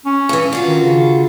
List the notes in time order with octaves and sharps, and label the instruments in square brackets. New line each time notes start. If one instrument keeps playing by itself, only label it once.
[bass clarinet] C#4
[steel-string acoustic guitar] G2 E3
D3 F4 F#4
[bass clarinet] D#3
C#3